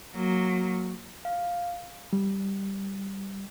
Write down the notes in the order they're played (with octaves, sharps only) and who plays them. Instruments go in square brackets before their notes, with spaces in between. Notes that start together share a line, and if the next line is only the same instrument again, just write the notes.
[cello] F#3 A#3
[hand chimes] F5
[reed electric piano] G3